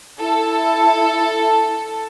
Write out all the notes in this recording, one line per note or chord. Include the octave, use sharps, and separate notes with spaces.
E4 A4